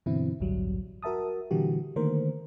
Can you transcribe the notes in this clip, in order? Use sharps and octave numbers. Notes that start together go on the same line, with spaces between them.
G2 B2 D3 E3 C4 E4
A1 D2 G2 F#3 G3
F#4 A#4 E5 A5 D#6
A#2 D3 E3 G3 F#4 G4
D3 D#3 A3 A#3 A#4 C5